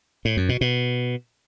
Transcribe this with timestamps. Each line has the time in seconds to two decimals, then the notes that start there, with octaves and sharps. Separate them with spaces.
0.25 A2
0.37 F#2
0.49 B2
0.61 B2